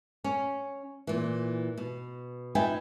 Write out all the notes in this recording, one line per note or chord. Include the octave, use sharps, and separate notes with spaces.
C#4
A#2 E3
B2
D#4 F4 B4 E5 G5 G#5